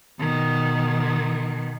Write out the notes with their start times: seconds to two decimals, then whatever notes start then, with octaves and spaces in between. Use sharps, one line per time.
0.19 B2 D#3